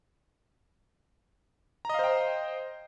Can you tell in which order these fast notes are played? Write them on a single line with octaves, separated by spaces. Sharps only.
A#5 D#5 F5 C5 G5